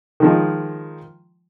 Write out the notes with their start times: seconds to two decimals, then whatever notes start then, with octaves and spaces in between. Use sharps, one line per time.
0.20 D#3 F3 G#3